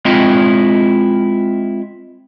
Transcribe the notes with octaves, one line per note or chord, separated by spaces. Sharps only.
G#3 C4 E4 F4 D#5